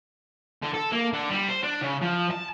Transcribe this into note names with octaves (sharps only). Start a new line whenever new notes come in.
D3
A4
A#3
D3
G3
C5
D4
C#3
F3
A5